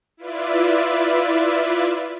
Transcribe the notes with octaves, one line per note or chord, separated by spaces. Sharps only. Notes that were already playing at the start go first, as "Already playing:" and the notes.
E4 F4 B4 D5 E5